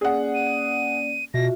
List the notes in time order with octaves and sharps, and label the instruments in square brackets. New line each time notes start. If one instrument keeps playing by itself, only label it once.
[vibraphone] A#3 C#4 D5 [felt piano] G#4 F#5
[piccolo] D#7
[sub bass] B2 [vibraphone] F4 F#4 E5 [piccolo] A#6